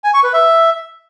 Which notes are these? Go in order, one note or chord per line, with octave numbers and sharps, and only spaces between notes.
G#5
C#6
B4
E5